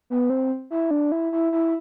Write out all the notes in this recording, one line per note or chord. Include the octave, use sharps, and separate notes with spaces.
B3
C4
E4
D4
E4
E4
E4